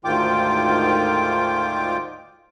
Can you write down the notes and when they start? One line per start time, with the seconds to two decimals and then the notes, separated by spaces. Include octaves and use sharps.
0.05 D2 G#2 D#3 F4 G5 D6